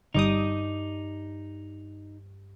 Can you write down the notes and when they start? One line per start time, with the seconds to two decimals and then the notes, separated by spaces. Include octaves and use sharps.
0.14 G1 G2 G3 D#4 D6 D#6 G6